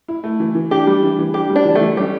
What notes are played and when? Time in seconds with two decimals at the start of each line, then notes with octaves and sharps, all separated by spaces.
0.08 E4
0.24 A3
0.40 E3
0.55 E3
0.71 D4 G4
0.87 G3
1.03 E3
1.19 E3
1.34 D4 G4
1.50 G3
1.56 D4
1.65 E3
1.75 A3
1.81 E3
1.97 G3 C#4